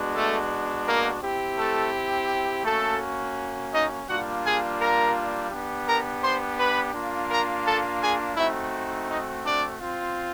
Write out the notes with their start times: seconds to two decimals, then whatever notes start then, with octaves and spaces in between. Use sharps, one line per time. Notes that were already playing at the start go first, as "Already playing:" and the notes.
Already playing: G#3 B3 D4 F#4
0.14 A3 A4
0.86 A#3 A#4
1.21 C4 E4 G4
1.57 A3 A4
2.64 A3 A#3 C#4 F#4 A4
3.71 D#4 D#5
4.07 G3 A#3 D4 F4 F#4 F#5
4.43 G#4 G#5
4.79 A#4 A#5
5.50 B3 D4 G4
5.86 A#4 A#5
6.22 C5 C6
6.57 B4 B5
6.93 A#3 D4 F4
7.29 A#4 A#5
7.65 A4 A5
8.01 G#4 G#5
8.36 A3 C4 D#4 E4 F#4 E5
9.08 D#4 D#5
9.43 D4 D5
9.79 C4 F4